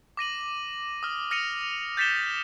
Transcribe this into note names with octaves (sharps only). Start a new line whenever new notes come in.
D6 A#6 D#7 F#7
D#6 F6
F6 A#6 C#7 D#7 F7
G6 A6 B6 C#7 E7 G7